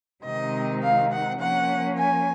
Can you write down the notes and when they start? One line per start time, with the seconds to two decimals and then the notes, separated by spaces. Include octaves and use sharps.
0.24 C3 D#3 G#3 C4 D#4 D#5
0.83 F5
1.12 F#5
1.40 F3 A#3 C#4 F#5
1.97 G#5